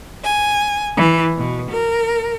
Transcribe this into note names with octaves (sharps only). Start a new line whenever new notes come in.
G#5
E3
B2
A#4